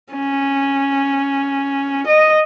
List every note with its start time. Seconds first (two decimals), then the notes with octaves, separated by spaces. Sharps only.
0.13 C#4
2.06 D#5